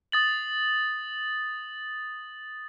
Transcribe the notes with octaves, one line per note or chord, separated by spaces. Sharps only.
D#6 A6 F#7